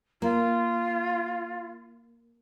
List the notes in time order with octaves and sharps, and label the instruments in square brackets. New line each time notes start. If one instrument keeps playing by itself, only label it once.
[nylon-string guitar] A#3 [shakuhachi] F4